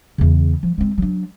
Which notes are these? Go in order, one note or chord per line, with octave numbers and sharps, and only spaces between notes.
E2 C#3
F3
G#3 C4
F#3 D4